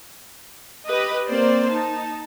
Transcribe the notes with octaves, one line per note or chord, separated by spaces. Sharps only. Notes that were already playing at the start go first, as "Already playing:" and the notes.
G4 B4 D#5
A#3 C4 C5 D5
D#4 A5